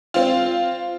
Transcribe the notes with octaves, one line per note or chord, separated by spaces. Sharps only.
C4 F4